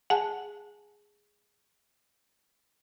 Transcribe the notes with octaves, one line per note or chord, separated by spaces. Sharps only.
G#4 F#5 G#5 A5